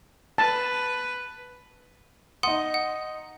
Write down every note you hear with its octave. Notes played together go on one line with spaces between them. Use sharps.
B4 A5
D#4 F#5 C6 D#6
F#5